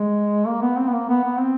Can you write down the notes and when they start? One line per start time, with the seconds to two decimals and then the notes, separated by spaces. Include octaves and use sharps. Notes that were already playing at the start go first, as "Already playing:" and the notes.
Already playing: G#3
0.46 A#3
0.62 B3
0.77 C4
0.88 B3
0.93 A#3
1.09 B3
1.24 B3
1.40 C4